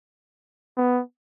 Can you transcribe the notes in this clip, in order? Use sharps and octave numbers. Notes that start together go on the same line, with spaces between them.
B3